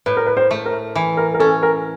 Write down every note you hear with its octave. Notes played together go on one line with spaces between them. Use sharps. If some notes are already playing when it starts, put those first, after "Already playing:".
A2 B4
A#4
B4
C5
A3
A#4
E3
A#4
A#4
C#4 A4
A#4